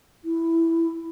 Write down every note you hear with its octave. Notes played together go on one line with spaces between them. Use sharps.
E4